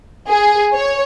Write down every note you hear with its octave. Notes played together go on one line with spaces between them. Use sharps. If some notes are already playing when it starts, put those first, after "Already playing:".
G#4
C#5